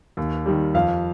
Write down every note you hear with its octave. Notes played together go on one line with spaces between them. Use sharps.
D#2
D#3 G3
F2 F5